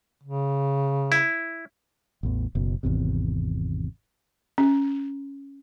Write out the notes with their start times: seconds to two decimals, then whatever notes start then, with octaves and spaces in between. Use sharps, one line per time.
0.24 C#3
1.12 E4
2.23 A1 E2
2.55 F#1 B2
2.83 G#1 E2 C3
4.58 C#4